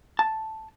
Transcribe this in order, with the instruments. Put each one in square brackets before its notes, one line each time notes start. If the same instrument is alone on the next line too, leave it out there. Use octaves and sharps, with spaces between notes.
[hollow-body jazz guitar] A5